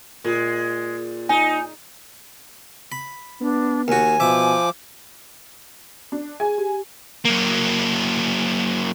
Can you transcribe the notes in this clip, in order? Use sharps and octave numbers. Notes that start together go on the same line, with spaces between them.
A#2 G#3
D#4 G#5
B5
B3 D4
D#2 F#4 G#5
B2 F3 E5 D6
D4
G#4 G#5
G4
F#3 A#3